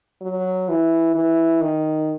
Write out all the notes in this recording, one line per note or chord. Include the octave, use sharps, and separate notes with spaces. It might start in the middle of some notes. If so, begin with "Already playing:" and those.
F#3
E3
E3
D#3